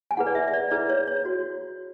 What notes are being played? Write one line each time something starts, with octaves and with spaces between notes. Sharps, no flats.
G#5
E4 G#4 B4 F#5
D5
E5
E5
D5
E4 G#4 B4 D5
C#5
C#5
F#4 C#5